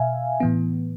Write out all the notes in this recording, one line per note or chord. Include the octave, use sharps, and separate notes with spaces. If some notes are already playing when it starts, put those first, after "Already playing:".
Already playing: B2 E5 F5 G#5
A2 E3 B3